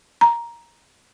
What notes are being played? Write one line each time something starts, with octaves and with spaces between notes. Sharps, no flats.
A#5